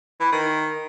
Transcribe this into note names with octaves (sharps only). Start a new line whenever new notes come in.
E3
D#3